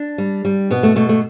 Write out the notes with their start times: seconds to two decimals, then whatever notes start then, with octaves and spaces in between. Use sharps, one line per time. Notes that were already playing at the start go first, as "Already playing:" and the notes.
Already playing: D4
0.18 G3
0.45 G3
0.70 B2 B3
0.83 A3
0.96 B2 A3
1.09 A3